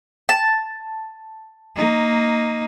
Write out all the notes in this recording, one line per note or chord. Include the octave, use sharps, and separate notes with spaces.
A5
A#3 D#4